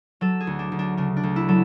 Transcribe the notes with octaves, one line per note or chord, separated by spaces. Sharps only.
F#3 A4
G#4
D2
D4
D2
D4
C#3 D4
D4
D2
E4
F#3 A4